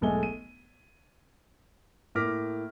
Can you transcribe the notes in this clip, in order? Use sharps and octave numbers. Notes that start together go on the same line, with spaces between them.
E1 B1 G#3 A3 G#5 G7
D#7
A2 A#3 D6 F6 A#6 B6